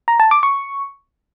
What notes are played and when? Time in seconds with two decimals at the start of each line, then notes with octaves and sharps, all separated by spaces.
0.08 A#5
0.20 A5
0.31 D6
0.43 C#6